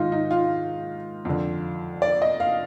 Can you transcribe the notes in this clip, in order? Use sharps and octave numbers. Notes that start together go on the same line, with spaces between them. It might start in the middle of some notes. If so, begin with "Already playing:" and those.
Already playing: G#2 D#3 D#4 F4
D#4
F4
F2 D3
D5
D#5
F5